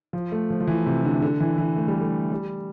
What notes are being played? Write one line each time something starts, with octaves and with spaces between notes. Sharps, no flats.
F3
A3
F3
F3
E3
C3
D3
D3
E3
E3
A3
G3
A3
G3